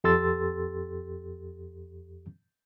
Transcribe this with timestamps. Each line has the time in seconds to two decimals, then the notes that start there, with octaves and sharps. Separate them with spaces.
0.04 F2 G4 A4 C6 E6 A6